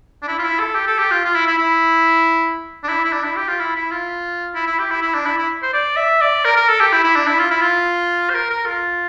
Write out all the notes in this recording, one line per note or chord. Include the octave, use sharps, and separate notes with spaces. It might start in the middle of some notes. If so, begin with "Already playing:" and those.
D4
E4
F4
E4
A4
G4
A4
G4
F4
F4
E4
E4
E4
D4
E4
E4
D4
E4
G4
F4
E4
E4
F4
E4
E4
G4
E4
E4
D4
E4
E4
C5
D5
E5
D5
A#4
A#4
A4
G4
E4
E4
D4
E4
F4
E4
F4
C5
A#4
A#4
F4